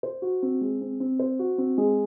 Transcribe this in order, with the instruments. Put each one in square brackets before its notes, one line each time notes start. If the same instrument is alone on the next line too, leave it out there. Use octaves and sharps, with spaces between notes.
[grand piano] C5
F#4
C4
G#3
C4
C4
C5
F#4
C4
G#3